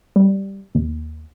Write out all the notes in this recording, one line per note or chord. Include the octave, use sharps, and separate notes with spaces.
G3
D#2